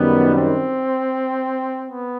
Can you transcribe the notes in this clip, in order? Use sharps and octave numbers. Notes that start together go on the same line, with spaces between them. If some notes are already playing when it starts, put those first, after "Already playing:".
Already playing: F#2 D#3 G3 B3
C4
B3